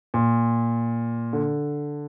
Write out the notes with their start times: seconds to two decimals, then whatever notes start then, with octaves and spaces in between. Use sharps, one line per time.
0.14 A#2
1.33 D3